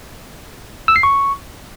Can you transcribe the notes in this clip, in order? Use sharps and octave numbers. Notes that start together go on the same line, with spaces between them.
E6
C7
C#6